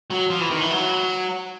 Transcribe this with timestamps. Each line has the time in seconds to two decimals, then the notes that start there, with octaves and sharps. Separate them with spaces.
0.10 F#3
0.30 F3
0.40 E3
0.51 D#3
0.60 E3
0.71 F#3